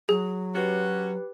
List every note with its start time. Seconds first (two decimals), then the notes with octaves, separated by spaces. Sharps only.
0.09 F#3 G#4
0.55 C#4 F#4 G4 B4